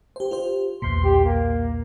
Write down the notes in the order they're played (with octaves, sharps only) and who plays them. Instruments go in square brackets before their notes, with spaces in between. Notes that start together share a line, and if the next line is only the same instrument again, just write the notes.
[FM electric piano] G4 C5
F4 G4 C5
[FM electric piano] B1 E2 A#2 [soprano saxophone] C6
[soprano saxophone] G4
A#3